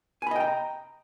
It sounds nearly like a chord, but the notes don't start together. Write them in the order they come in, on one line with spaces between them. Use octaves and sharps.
G#5 B5 D#5 G5 A#5